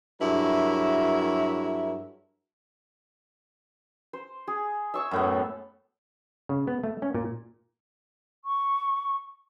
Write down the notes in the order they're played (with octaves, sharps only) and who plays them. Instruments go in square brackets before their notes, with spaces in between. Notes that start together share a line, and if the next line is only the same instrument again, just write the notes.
[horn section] G2 F#3 E4 G#4 A#4 E5
[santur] C5
G#4
E5 C#6 E6
[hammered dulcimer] F#2 A2 B3
[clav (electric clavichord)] C#3
B3
A3
C#4
A#2
[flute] C#6